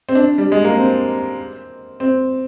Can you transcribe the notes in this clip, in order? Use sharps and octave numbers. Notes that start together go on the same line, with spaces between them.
C4
D4
G3
G#3
A#3
C4
C4